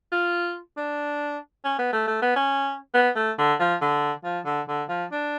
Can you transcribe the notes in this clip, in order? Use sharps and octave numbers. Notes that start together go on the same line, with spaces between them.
F4
D4
C#4
B3
A3
A3
B3
C#4
B3
A3
D3
F3
D3
F3
D3
D3
F3
D4